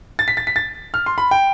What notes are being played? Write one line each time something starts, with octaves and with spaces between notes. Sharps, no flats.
A6
B6
A6
B6
A6
F6
C6
B5
G5